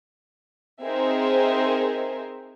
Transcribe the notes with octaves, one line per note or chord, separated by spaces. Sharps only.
C4 D#4 G#4 A#4 C5 E5